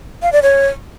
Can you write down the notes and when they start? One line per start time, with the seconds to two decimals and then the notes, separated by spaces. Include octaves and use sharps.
0.22 F5
0.33 D5
0.43 C#5